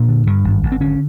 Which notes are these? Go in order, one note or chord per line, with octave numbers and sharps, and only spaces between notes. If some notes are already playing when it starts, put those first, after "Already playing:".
Already playing: A#2 D4
D3
G2
G#1
G#1
C4
D3 C#4